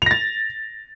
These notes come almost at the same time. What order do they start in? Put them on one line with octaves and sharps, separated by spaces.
F7 A#6 A6